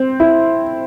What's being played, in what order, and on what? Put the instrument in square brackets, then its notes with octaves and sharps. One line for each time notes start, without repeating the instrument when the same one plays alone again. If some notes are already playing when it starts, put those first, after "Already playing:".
Already playing: [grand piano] C4
E4